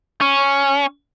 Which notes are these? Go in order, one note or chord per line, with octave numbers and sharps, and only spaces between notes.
C#4